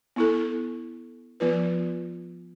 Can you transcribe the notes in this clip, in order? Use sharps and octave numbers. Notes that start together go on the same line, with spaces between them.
B3 E4 A4
F3 B3 F4 B4